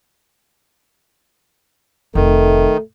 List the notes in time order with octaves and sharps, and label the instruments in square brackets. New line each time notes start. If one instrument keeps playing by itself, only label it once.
[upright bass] F1 [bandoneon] D#3 [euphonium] A3